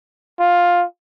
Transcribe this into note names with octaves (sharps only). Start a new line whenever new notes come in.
F4